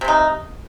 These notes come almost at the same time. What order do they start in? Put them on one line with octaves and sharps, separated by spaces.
C3 C4 D#4